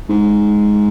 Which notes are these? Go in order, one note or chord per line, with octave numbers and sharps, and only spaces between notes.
G#2